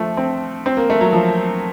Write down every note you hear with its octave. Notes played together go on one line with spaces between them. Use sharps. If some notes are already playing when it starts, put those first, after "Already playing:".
Already playing: F3 A3
C4
C4
A#3
A3
F#3
F3